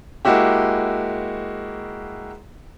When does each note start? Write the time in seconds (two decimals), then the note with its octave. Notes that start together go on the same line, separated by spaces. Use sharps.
0.25 G#3 A#3 E4 F#4 G4